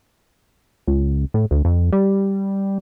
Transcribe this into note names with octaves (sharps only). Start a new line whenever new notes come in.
C#2
A2
D2
F2
G3